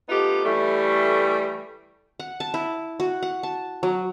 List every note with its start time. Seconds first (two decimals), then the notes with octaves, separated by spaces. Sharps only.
0.09 A3 B3 D#4 F4 G4
0.44 E3 G3 A3
2.19 F#5
2.40 A5
2.54 E4
3.00 F#4
3.22 F#5
3.43 A5
3.83 F#3